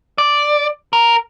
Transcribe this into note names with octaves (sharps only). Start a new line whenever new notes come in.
D5
A#4